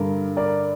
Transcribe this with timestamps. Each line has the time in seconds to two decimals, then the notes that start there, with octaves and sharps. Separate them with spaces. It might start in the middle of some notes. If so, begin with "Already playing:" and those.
Already playing: G2 D3 G3 A#4
0.37 A#4 D5